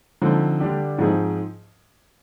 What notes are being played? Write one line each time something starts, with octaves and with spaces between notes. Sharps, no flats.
D3 F3 C4 D#4
D3 G3 D4 G4
G#2 F3 C4 D#4 G#4